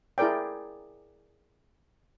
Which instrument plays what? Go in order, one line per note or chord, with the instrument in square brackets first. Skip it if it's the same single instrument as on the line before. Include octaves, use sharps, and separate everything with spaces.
[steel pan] E4 G#4 A#4 D5 G5